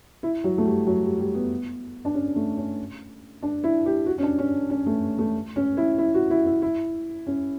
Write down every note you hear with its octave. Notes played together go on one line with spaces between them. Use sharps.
E4
F#3
A3
G3
F#3
G3
G3
B3
D4
C#4
A3
C#4
D4
E4
G4
F#4
C#4
D4
C#4
C#4
A3
A3
C#4
E4
E4
F#4
E4
E4
E4
C#4